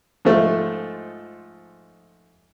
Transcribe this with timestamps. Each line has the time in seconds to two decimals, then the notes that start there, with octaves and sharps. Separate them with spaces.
0.25 G#2 F3 A3